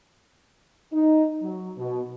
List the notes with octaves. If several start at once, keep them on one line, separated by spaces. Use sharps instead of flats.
D#4
F#3
B2